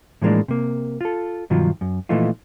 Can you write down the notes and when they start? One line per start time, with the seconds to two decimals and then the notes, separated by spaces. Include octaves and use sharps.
0.22 A2 E3 F3 G#3 A#3 D4
0.48 C3 A#3
1.01 F4 A4
1.50 G2 B2 D#3 F3 F#3 F4
1.81 F#2
2.09 A#2 E3 F3 A3 D#4 F4